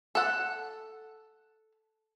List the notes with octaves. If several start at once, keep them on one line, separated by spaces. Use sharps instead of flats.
A4 F#5